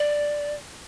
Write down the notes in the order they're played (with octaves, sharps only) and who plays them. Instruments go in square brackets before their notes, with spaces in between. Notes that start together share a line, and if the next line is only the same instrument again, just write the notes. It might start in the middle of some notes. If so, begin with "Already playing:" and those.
Already playing: [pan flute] D5